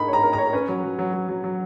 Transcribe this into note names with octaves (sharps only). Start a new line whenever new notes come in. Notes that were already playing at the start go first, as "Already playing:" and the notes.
Already playing: G#3 D#4 A#4 B5
C#5 A#5
A#4
A#5
C#5
C#4 B4
F#3
F#3
F#3
F#3
F#3
F#3